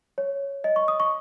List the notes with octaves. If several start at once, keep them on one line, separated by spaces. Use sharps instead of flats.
C#5
D#5
C#6
D#6
C#6